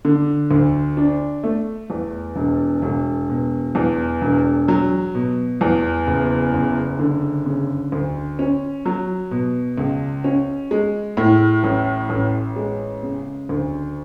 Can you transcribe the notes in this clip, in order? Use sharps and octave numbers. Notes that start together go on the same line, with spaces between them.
D3
D2
D4
A3
E2
E1
E1
B2
E2
E1
F#3
B2
E2
F#1
F#1
D3
C#3
D2
C#4
F#3
B2
C#2
C#4
G#3
A2
A1
A1
G#3
C#3
D2